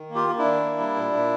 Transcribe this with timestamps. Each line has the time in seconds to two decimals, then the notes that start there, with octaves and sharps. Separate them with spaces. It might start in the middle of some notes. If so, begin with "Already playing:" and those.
Already playing: D#3
0.10 A#3
0.15 F4 G4
0.27 A#3
0.39 D4 E4
0.44 D#3
0.62 A#3
0.79 G3
0.96 A#2
1.13 A#2